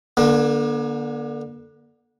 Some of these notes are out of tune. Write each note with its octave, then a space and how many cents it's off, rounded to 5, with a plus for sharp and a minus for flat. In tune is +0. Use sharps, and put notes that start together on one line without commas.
D3 +0 A#3 +45